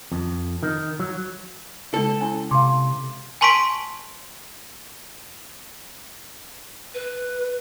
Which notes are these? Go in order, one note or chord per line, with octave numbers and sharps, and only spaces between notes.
F2
D#3
F#3
C#3 G#3 A4
C#4 E4 G#5 A5
C3 F5 C6 D6
G#5 A5 C6 C#6 B6 D7
B4